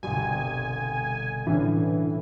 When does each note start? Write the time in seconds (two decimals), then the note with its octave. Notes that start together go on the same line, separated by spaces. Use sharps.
0.03 G1 C2 B2 G3 G#5
1.47 A2 D3 E3 C#4